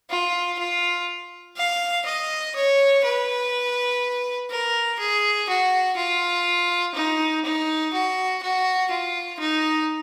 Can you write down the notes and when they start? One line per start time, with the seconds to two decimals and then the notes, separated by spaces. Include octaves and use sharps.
0.10 F4
0.59 F4
1.57 F5
2.06 D#5
2.56 C#5
3.04 B4
4.50 A#4
5.00 G#4
5.49 F#4
5.97 F4
6.95 D#4
7.45 D#4
7.93 F#4
8.43 F#4
8.91 F4
9.39 D#4